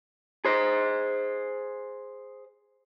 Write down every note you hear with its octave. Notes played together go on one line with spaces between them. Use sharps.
G#4 C5